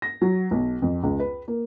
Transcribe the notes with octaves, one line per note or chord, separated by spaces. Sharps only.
A#6
F#3
B1
F2
C#2
B4
A#3